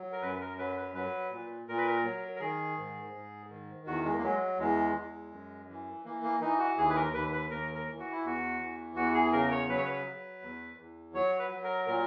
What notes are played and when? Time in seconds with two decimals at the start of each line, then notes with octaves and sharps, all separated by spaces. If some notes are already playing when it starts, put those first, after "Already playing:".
Already playing: F#3
0.12 A#4
0.22 F#2 B4
0.41 A#4
0.59 F#3 B4
0.77 B4
0.95 F#3 B4
1.31 A#2
1.68 A#2 A#4
1.78 B4
1.87 A#4
2.04 F#3
2.36 A#4
2.40 D#3 G#4
2.77 G#2
3.13 G#2
3.50 D#3
3.87 E2 F#4
4.05 G#3
4.18 A#3
4.23 F#3 G#3
4.59 E2 G#3
4.96 E2
5.31 F#2
5.69 E3
6.04 E3 A#3
6.23 A#3
6.41 E3 D#4
6.59 F#4
6.78 D#2 G#4
6.90 B4
6.96 A#4
7.14 D#2 B4
7.33 B4
7.50 D#2 A#4
7.75 A#4
7.87 E3
7.99 F#4
8.12 E4
8.24 E2 F#4
8.60 E3
8.96 E2 F#4
9.14 G#4
9.32 C#3 A#4
9.51 C#5
9.69 F#3 B4
9.77 C#5
9.85 B4
10.05 F#3
10.42 E2
10.78 E2
11.14 F#3 C#5
11.39 B4
11.51 F#3
11.64 A#4
11.87 A#2 A#4